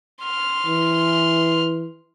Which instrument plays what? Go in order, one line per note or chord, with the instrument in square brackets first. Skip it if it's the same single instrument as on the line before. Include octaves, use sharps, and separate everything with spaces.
[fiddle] C6 F6
[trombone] E3